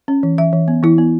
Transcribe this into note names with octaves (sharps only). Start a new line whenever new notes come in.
C#4
E3
E3 E5
E3
B3
E3 E4
B3